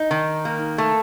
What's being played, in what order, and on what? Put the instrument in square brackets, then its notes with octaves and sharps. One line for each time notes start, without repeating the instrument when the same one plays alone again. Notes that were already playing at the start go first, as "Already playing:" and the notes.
Already playing: [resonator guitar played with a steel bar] D#4
D#3
A#3
A3